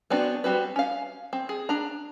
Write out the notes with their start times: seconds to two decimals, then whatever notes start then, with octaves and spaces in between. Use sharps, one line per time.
0.10 B3 C4 D4 F#4
0.44 G3 C4 F#4 B4
0.76 C#4 F5
1.33 C4
1.49 G#4
1.69 D4 A#5